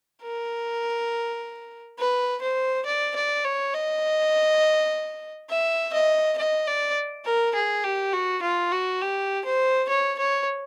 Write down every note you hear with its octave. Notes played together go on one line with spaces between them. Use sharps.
A#4
B4
C5
D5
D5
C#5
D#5
E5
D#5
D#5
D5
A#4
G#4
G4
F#4
F4
F#4
G4
C5
C#5
C#5